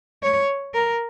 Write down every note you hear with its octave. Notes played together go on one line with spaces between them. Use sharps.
C#5
A#4